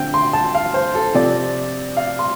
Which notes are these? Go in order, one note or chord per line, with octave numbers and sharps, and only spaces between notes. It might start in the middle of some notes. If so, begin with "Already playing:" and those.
Already playing: D3 C4 G5
C6
A5
F5
C5
A4
C3 F3 C4 D5
F5
C6